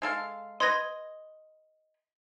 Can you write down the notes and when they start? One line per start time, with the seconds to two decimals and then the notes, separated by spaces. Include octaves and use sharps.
0.02 G#3 A4 F5
0.60 B4 D#5 C6 G#6 A#6